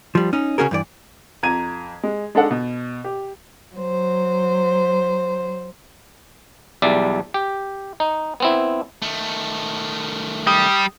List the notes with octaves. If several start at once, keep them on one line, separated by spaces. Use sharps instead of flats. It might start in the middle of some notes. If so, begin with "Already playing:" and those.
F3 G3
C#4 D#4
C#3 C#4 F#4 G#4 A#4
G2 E3 D5
F2 A#5 G#6 D#7
G#3
G#3 D4 D#4 A4 F#5
B2
G4
F#3 C5
B1 E2 G3 D5 E5
G4
D#4
B3 C4 E4
D#3 A3
G3 D#6